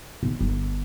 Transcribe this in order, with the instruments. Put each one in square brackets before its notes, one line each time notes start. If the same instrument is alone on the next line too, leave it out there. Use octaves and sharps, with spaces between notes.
[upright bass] B1 D#3
G1